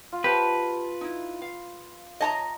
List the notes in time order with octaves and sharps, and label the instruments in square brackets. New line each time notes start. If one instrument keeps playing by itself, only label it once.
[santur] F4
[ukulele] G4 C5 A5 [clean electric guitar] B4
[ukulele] D#4 E4
F5
[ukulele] C#5 [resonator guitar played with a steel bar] D#5 A5 A#5